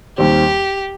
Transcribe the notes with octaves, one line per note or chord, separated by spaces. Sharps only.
D#2 D#3 G3 C4 G4